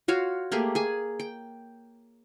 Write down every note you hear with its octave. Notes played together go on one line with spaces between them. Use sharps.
F4 F#4 C#5 F5
A3 A#3 G4 G#4
G#4 G#5
G5